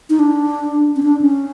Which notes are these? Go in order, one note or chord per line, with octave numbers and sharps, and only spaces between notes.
D#4
D4
C#4
D4
C#4